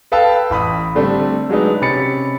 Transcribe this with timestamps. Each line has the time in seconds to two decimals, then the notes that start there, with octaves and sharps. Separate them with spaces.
0.12 A4 B4 F5 G5 A5 E6
0.50 A1 B5 D#6
0.95 D3 G3 A3 C4 D4
1.50 F#3 G#3 D4 D#4 B4
1.82 C3 C#4 B5 A6 C#7